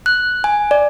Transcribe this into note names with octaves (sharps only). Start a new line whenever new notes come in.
F#6
G#5
D5